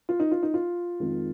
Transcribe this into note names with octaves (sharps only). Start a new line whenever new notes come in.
F4
D#4
F4
D#4
F4
F2 D#3 G#3